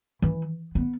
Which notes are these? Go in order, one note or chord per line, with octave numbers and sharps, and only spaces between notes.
E3
B3